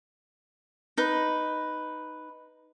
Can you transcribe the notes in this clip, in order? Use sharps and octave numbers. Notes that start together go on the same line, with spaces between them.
D#4 B4